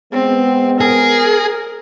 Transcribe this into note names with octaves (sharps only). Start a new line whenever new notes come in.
G#3 B3 C4
G#4 A#4